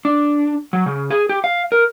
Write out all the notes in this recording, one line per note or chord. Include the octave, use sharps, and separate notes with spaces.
D4
F#3
C#3
G#4
G4
F5
A#4